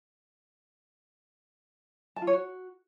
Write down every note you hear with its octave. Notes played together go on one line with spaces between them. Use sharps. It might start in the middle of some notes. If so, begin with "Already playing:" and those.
A5
F4
C#5
F#4